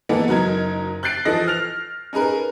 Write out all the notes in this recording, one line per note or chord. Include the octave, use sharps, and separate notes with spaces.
D#3 E3 G#3 A#3 B3 A4
F#1 F#3 D#4 A#4 G#6
F#6 G6 A6 C7 D7
E3 F3 A4 D#5 F#6 A#6
F6 F7
C#4 D#4 G#4 A#4 B4